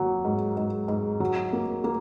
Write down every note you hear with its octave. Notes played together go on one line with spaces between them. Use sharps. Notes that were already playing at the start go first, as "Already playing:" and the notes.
Already playing: F#3 A#3
G#2
G#2
G#2
F#3
A#3
A#3